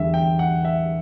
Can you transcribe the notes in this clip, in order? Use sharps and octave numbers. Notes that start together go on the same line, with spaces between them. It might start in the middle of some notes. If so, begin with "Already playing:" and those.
Already playing: E2 D3 G3 E5
G5
F#5
E5